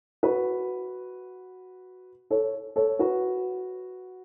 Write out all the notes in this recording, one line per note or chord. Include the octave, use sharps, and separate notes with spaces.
F#4 B4
A4 C#5
A4 C#5
F#4 B4